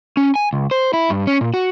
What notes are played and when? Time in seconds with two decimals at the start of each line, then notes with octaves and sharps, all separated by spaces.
0.17 C#4
0.36 G#5
0.53 C#2
0.71 C5
0.93 E4
1.10 G2
1.27 C#4
1.41 A#2
1.54 F#4